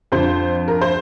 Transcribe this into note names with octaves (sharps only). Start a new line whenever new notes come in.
F2 D3 F3 C5
A#4
C5